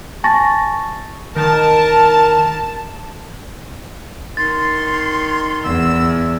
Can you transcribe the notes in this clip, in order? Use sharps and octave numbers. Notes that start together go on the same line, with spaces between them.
G#5 A5 C#6 A6 A#6
D#3 A#4 A5
D#3 C6 A6
E2 E6